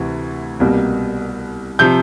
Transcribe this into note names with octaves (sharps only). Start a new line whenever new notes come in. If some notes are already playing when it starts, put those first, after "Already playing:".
Already playing: D2 C3 E3
C2 B2 G3 A#3
C3 F3 G6